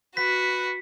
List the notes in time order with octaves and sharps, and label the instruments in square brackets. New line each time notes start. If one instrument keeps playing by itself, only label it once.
[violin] F#4 [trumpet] B4 [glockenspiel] B6